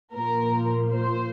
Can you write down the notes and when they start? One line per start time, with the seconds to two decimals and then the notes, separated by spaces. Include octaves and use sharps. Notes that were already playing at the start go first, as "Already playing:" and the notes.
0.14 A#2 F3 A#3 F4 A#4
0.92 C5